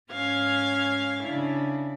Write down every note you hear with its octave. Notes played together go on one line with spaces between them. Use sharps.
G#2 C#4 F5 F6 G#6
C#3 D4 E4